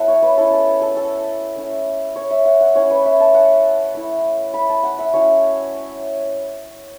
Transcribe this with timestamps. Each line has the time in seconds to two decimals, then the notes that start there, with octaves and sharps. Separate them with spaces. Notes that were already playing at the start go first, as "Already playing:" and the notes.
Already playing: F#3 B3 E4 E5 F#5 A5
0.08 C#5
0.22 B4
0.37 F#3 C#4 E4 A4
0.52 A4
0.82 A4
0.97 A4
1.56 A3 C#4 E4
2.16 C#5
2.31 E5
2.45 F#5
2.61 F#5
2.75 A3 C#4 E4 C#5
2.90 B4
3.05 E5
3.20 A5
3.35 F#5
3.95 A3 E4
4.54 B5
4.69 A5
4.83 F#5
4.99 E5
5.13 F#3 C#4 E4 C#5